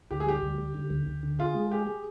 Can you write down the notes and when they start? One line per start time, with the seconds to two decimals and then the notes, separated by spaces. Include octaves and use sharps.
0.11 D2 G4
0.20 G#4
0.26 G3 G4
0.42 D2
0.58 G3
0.74 D3
0.90 D2
1.07 D2
1.23 D3
1.39 F4 G#4
1.55 G#3
1.71 G4 G#4
1.87 G#4